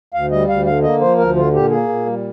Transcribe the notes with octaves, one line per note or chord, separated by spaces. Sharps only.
D2 F5
G3 D#5
D2 F5
D3 F5
A#3 D#5
F3 C5
D2 A#4
D3 F4
A#2 G4
A#3 G#4
A#2
G3